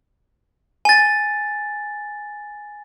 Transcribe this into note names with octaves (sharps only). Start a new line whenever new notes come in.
G#5 A6